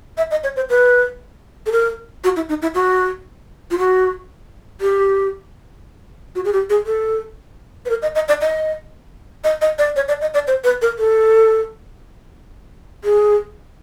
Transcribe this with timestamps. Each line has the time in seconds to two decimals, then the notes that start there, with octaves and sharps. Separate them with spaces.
0.18 E5
0.31 D#5
0.44 C#5
0.56 C5
0.70 B4
1.66 A4
1.72 A#4
2.24 F#4
2.36 E4
2.49 D#4
2.62 E4
2.75 F#4
3.71 F4
3.78 F#4
4.81 G4
6.35 F#4
6.45 G#4
6.53 G4
6.70 G#4
6.86 A4
7.86 B4
7.90 A#4
8.02 D#5
8.15 D#5
8.28 D5
8.41 D#5
9.44 D#5
9.61 D#5
9.79 D5
9.96 C#5
10.08 D5
10.21 D#5
10.34 D5
10.47 C5
10.64 B4
10.82 A#4
10.99 A4
13.04 G#4